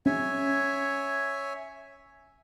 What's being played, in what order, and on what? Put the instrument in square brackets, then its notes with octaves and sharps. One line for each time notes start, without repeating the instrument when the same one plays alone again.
[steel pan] C#4 [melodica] C#5 E5 G#5